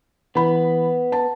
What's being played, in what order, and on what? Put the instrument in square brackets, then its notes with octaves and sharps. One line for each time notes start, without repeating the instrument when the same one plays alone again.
[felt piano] E3 B5 [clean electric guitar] B3
[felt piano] A5